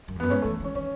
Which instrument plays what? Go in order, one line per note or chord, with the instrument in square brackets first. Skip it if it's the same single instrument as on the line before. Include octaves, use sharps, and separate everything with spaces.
[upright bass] F#2
E2
[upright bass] F#2 [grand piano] B3
[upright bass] G#2 [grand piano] C#4
[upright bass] E3 [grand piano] A3
[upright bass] E3
[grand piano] C#4
[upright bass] D#3 [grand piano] C#4